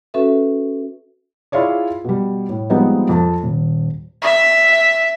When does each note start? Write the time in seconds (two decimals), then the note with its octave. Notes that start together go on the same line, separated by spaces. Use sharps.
0.14 C#4 F#4 A4 B4 E5
1.52 E4 F4 G#4 C#5 D5
2.04 B2 G3
2.49 A2
2.70 F3 G3 G#3 B3 C4 D#4
3.09 F2 A4 A5
3.44 D#1
4.22 E5